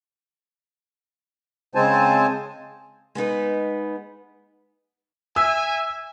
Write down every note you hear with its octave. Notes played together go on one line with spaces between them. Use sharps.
C#3 G#3 C4 C5 G#5 A5
G#3 B3 D#4 B4
E5 G#5 E6